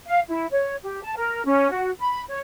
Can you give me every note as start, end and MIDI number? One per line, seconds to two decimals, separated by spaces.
0.07 0.21 77
0.28 0.46 64
0.50 0.76 73
0.83 1.01 67
1.03 1.14 81
1.16 1.45 70
1.46 1.71 61
1.71 1.91 66
1.99 2.22 83
2.29 2.40 73